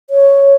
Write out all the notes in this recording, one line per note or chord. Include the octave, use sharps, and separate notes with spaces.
C#5